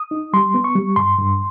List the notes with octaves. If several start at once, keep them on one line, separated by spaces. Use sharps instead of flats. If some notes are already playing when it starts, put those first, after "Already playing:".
Already playing: D#6
D#4
G3 C6
B3
C#6
G3
G2 C6
G2